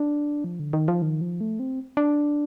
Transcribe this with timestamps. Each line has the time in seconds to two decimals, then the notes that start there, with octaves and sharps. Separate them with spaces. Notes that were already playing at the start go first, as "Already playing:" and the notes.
Already playing: D4
0.44 F3
0.60 D3
0.73 D#3
0.88 F3
1.02 D#3
1.21 F3
1.41 A3
1.60 C4
1.97 D4